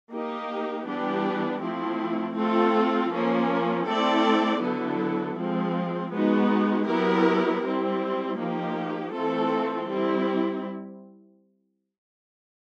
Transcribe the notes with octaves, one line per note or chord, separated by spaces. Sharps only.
A#3 D#4 G4
E3 G3 B3 D4 G4
F3 A3 C4 E4
A3 C4 F4 A4
F3 A#3 C#4
A3 C4 E4 A4 D5
D3 F#3 B3 E4 A4
F3 G#3 C4
G#3 B3 D#4 F#4
F#3 B3 E4 G4 A#4
G3 C4 E4
F3 A#3 D#4 G4
E3 A3 C4 F4 A4
G3 C4 E4